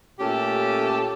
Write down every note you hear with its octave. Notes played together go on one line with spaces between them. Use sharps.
A#2 A3 C#4 G4 A4